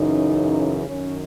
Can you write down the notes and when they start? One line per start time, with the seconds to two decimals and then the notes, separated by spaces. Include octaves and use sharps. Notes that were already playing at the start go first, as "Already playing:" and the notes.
Already playing: F#2 C#3 E3 D#4
0.86 F#2 D#3 C#4